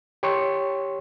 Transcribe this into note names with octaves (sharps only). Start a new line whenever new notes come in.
G4 C#5 C6 C#6